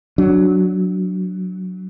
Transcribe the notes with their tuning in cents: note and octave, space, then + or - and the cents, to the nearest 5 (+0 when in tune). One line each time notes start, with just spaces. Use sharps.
F#3 +0 D4 +0